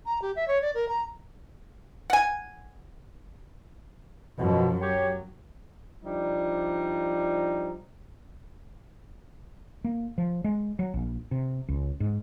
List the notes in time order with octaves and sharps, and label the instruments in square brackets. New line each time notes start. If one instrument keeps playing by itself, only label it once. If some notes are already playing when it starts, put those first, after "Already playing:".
[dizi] A#5
G4
E5
C#5
D5
A#4
A#5
[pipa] F#5 G#5
[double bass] F#2 F3 [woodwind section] B2
[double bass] F#3 [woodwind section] G4 C#5
[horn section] F3 G3 D4 D#4
[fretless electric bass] A#3
F3
G#3
F#3
A#1
C3
C#2
G#2